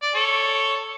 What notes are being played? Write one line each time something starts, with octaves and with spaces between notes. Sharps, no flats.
D5
A4 C#5